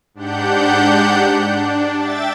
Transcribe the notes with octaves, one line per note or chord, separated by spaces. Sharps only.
G#2 D4 G4 F#5 G6
D4
E5 G5 A6